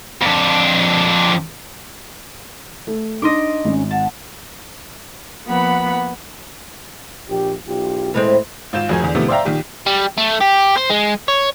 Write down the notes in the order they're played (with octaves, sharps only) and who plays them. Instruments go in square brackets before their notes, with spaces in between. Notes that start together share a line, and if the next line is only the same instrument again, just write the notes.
[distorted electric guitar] F2 D4
[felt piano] A3
[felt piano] D4 D#4 [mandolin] D#5 C6 D6
[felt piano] G#1 [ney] C#4
[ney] F#5 [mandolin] A5
[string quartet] F3 A#3 B3 F#5 B5
[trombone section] A#1 G4
B1 F4 G4
[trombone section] A2 [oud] E3 G#3 C4
[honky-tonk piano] G#1 F4 G6 E7
F1 F2 F#4 G#4 A#4 G#5
E2 D3
A2 C3 D#3 F3 A3 B3
C5 D5 E5 F5 G5 A#5
A#1 D#3 G4
[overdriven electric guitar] G3
A3
G4
C5
G#3
C#5